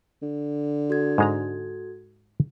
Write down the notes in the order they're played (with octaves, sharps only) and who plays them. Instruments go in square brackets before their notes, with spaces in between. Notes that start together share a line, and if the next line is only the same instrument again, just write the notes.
[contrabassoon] D3
[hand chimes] F#4 A4 G#6
[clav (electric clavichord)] G#2 G#3 A#5